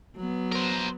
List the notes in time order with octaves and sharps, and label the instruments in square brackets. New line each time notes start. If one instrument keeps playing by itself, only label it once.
[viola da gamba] F#3 B3
[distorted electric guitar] A#4 C5